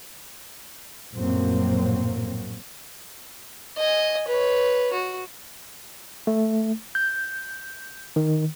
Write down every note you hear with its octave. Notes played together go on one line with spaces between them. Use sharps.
A#1 F#2 A2 F#3 A#3 C4
D#5 G#5
B4 C#5
F#4
A3
G6
D#3